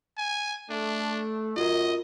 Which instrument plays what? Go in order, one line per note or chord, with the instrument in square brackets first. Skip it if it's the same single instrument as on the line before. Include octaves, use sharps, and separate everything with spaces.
[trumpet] G#5
[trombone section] A3 [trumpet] D4
[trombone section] F#2 [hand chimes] F4 F#4 A#4 [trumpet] D#5